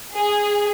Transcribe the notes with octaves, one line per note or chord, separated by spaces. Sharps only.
G#4